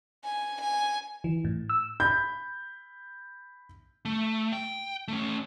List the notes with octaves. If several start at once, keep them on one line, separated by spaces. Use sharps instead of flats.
G#5
G#5
E3
A2
E6
B5 G6
A3
G5
A3 C#4